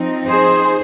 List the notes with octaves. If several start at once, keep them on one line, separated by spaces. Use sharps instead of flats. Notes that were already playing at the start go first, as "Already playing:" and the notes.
Already playing: F3 C4 D#4
G#4 C5